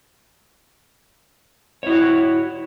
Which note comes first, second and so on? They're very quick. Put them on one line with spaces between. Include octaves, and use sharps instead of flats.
C#5 E4 F#4